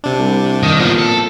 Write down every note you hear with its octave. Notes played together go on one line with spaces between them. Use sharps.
C3 D4
C2
D#3
A#2 F3 B3
A4